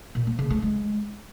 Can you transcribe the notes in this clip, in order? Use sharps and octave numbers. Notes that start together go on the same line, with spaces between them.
A#2
A#3
C#3
A3
G#3